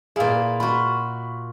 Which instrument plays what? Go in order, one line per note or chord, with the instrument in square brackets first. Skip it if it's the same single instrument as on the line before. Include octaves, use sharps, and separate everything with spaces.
[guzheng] A#2 E4 [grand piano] G#4 F5
[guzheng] F4 F#4 [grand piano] B5